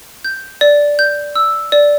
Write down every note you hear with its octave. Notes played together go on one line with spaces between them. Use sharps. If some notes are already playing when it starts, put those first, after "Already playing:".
G6
D5
G6
E6
D5